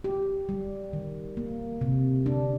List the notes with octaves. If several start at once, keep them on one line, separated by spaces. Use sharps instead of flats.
G4
G3
D#3
A#3
C3
D4